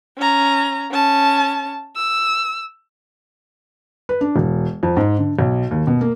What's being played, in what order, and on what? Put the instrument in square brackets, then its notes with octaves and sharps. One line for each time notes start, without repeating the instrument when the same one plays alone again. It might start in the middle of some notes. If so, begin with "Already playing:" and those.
[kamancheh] C#4 A#5
C#4 A5
E6
[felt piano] B4
D4
E1
F2
G#2
D3
B1
D#2
B2
A#3